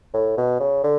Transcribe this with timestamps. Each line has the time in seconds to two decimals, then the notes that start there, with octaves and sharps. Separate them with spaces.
0.14 A2
0.38 B2
0.60 C#3
0.84 D3